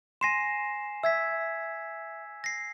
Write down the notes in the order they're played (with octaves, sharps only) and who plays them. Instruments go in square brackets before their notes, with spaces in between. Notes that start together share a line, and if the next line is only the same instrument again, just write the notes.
[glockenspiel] G#5 C7 E7 [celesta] C6 A#6
[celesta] E5 [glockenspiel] E6 G#6 B6
[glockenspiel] A#6 C7